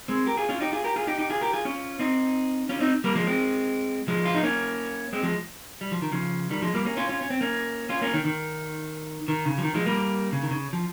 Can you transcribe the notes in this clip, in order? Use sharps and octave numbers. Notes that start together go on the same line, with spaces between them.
G#3 C4
G4 A#4
F4 G#4
C#4 F4
D#4 G4
F4 G#4
G4 A#4
F4 G#4
D#4 G4
D#4 G4
F4 G#4
G4 A#4
F4 G#4
C#4 F4
C4 D#4
C#4 F4
C4 D#4
G3 A#3
F3 G#3
G#3 C4
F3 G#3
F4
D#4
A#3 C#4
G#3 C4
F3 G#3
G3
F3
D#3
C#3 F3
D#3 G3
F3 G#3
G3 A#3
A#3 C#4
C#4 F4
C#4 F4
C#4
C4
A#3 C#4
C#4 F4
A#3 C#4
D#3
D#3
D#3
C#3
F3
D#3
F3 G#3
G3 A#3
C#3
D#3
C#3
F3